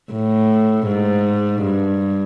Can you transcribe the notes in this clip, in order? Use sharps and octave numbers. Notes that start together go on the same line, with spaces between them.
A2
G#2
G2